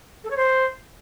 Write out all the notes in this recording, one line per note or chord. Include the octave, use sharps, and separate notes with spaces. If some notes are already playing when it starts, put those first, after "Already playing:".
A4
C#5
C5